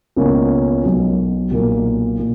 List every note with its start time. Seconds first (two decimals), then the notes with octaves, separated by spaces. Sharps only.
0.16 C#2 B2 A#3 C#4
0.84 B1 B2 F#3
1.51 B1 A#2 A#3
2.19 A#2